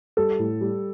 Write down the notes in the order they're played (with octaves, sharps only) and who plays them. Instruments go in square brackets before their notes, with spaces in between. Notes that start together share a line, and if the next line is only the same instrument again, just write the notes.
[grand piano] G3 [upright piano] A4
[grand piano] A2
G3